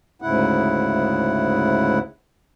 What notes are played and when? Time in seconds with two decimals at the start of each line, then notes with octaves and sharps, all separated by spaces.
0.22 D2 G#2 C#3 E4 F#5